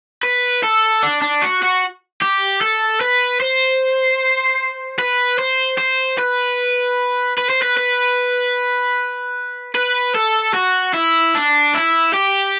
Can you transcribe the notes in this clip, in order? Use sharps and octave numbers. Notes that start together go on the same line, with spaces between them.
B4
A4
D4
D4
F#4
F#4
G4
A4
B4
C5
B4
C5
C5
B4
B4
C5
B4
B4
B4
A4
F#4
E4
D4
E4
G4